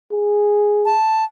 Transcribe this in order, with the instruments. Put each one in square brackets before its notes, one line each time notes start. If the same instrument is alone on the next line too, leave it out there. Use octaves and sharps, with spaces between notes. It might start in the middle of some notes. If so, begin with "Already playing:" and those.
[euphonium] G#4
[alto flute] A5